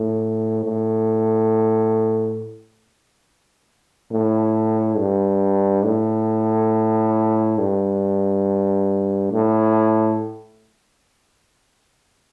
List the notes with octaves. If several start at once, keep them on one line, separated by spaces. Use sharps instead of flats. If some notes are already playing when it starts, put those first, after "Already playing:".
Already playing: A2
A2
A2
G2
A2
G2
A2